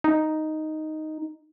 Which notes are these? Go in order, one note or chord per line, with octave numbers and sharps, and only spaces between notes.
D#4